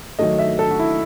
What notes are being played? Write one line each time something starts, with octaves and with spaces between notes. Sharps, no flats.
D#3 F#3 A3 D#5
E5
A4
F#4
E4